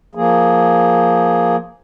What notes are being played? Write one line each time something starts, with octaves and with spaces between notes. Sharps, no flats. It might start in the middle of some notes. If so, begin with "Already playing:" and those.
F3 A#3 G#4